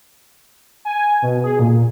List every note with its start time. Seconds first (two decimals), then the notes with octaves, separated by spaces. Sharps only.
0.85 G#5
1.22 B2
1.44 G#4
1.59 A#2